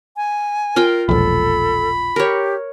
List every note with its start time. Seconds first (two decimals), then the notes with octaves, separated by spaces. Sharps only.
0.17 G#5
0.76 F4 A#4 F5 G5
1.09 E1 A#1 A4 B5
2.16 G4 A#4 C#5